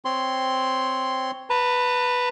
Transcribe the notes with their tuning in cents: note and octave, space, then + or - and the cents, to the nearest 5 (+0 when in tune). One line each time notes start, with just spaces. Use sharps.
C4 +0 C#5 +0 C6 +0
B4 +0 A5 +45